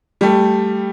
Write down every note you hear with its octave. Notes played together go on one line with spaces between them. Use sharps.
G3 A3